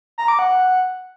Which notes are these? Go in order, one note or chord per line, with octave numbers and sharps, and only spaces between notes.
A#5
D6
F#5